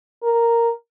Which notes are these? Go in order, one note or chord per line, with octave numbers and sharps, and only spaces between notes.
A#4